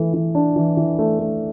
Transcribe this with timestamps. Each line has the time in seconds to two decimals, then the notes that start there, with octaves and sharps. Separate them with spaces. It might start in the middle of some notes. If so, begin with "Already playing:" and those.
Already playing: E3 A3 A4
0.14 E3
0.35 D4
0.56 E3
0.77 E3
0.99 A3
1.19 A3